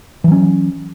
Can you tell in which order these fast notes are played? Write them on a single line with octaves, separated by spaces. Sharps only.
E3 F#3 C#4